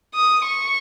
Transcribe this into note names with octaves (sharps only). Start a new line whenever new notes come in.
D#6
C#6